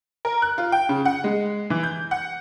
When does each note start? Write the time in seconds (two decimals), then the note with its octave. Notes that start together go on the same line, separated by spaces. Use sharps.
0.25 A#4
0.42 F#6
0.58 F4
0.72 G5
0.89 C#3
1.05 F#5
1.24 G#3
1.70 E3
1.83 G6
2.11 F#5